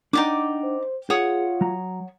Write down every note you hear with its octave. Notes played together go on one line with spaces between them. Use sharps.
D4 D#4 D5 F#5 G5 D6
C5
F4 G#4 C#5 F#5 D#6
F#3 A#5